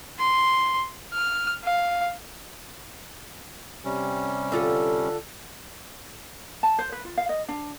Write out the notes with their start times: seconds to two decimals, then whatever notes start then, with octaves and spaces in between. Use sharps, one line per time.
0.19 C6
1.13 F6
1.64 F5
3.85 C3 G3 C#4
4.52 D3 F4 A4
6.63 A5
6.79 C5
6.92 B4
7.05 F4
7.18 F5
7.29 D#5
7.49 D4